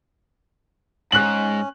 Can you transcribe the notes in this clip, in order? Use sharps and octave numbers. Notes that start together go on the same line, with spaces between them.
G#2 C#4 F#6 F#7